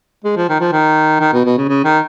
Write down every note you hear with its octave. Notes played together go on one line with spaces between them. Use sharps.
G#3
F3
D#3
F3
D#3
D#3
B2
B2
C#3
C#3
D#3